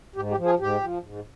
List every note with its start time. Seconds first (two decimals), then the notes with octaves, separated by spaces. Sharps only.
0.16 G#2 G4
0.31 G4
0.37 F3
0.45 G#4
0.59 G#2 G4
0.81 F3
1.03 G#2